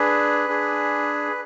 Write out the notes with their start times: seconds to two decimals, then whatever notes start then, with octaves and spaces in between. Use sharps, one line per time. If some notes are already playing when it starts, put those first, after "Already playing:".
Already playing: D4 G#4 B4
0.48 D4 G#4